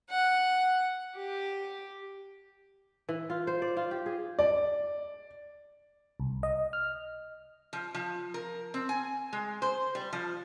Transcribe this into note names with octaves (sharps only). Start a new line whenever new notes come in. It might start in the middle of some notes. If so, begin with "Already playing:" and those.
F#5
G4
E3
F4
C5
D5
F4
G4
G#4
D5
C2
D#5
F6
F3
F3
A#4
C4
G#5
G#3
C5
G3
F3